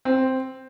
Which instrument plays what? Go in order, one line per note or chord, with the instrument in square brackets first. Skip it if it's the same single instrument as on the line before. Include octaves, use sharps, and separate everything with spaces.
[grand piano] C4